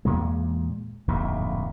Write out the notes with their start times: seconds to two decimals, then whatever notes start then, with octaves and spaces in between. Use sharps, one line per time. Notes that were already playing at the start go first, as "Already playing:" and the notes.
0.05 E2 A#2 G#3
1.08 D1 A#1 F2 G#2